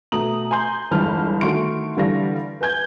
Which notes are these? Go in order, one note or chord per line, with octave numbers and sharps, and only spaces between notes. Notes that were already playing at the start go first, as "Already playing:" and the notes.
B2 A3 A#5 D#6 F#7
G#5 A#5 C6 G6
G1 E2 E3 G#3 A5 F6
D#3 A3 F#4 C6 C#6 D7
D3 E3 G3 D4 F5 A#6
B4 G#5 G6 G#6